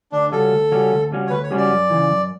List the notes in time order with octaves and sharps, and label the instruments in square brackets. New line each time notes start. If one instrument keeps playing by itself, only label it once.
[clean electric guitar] D2 [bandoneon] D4
[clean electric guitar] C#3 G3 C#4 F#4 [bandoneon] A4
[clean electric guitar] D2
C#3 G3 C#4 F#4
D2
C#3 G3 C#4 F#4
[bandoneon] C#5
[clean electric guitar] D2 [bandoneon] B4
[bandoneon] C#5
[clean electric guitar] C#3 G3 C#4 F#4
[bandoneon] D5
[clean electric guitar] F#2
C#3 E3
F#2